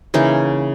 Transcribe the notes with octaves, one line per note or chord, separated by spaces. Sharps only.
C#3 E3 A#3 D#4